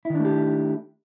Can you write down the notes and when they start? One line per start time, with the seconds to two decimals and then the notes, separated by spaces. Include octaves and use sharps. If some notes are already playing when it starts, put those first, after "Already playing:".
0.05 E4
0.10 D#3
0.15 D4
0.20 A3
0.25 G4